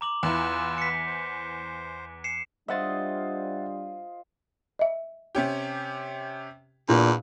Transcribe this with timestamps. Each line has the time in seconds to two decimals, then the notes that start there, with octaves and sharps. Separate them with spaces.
0.01 A#5 D6 F#7
0.23 E2 E4 F4 B4 E6
0.78 B6 C#7
1.07 C5
2.24 C7 C#7 E7
2.68 G3 D4 F4 C5 D#5 E5 F#5 A6
4.79 D#5 E5
5.35 C3 C#4 G4
6.89 E2 A#2 D4